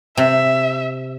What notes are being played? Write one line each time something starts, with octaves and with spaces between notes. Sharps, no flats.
C3 E5